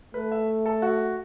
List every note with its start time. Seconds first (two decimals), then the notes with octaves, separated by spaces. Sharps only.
0.14 A3 B4
0.32 E5
0.66 A4
0.82 F#4